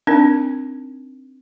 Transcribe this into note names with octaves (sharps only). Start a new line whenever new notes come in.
C4 D4 D#4 A#4